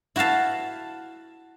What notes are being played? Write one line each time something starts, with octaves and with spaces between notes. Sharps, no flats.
E4 F#4 E5 F5 A5